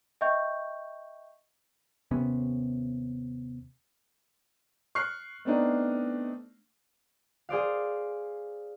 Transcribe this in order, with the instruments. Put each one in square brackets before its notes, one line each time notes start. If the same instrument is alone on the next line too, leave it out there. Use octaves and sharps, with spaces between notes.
[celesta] D#5 E5 G5 C#6 G6
[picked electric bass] D#2 C3 B3 C#4
[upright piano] C#6 F6 F#6 C7
A3 B3 C4 D4 D#4
[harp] G#4 C5 D5 F5